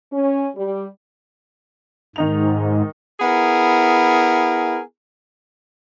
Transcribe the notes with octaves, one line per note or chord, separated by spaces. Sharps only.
C#4
G3
G#2 D#3 D#4 F7
B3 E4 G#4 A#4